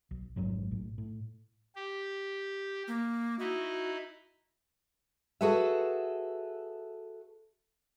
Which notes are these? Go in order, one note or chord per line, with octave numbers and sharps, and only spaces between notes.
B1
A1 F2 G#2 F#3
B1 A2
A2
G4
A#3
D#4 E4 F#4
F#4 G#4 A4 B4 E5